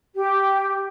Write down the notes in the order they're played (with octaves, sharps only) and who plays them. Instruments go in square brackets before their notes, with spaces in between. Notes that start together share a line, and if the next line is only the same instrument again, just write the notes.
[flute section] G4